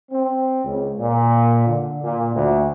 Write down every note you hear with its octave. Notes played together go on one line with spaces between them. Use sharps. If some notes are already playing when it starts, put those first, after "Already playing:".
C4
C#2
A#2
D3
A#2
D2